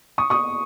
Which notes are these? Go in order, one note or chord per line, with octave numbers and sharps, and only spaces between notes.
C#6 D#6
C#6 D#6